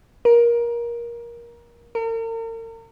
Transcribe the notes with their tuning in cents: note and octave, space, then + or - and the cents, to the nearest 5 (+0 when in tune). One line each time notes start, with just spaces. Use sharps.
A#4 +20
A#4 -40